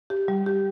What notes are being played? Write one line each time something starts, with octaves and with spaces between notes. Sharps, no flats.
G4
G3
G4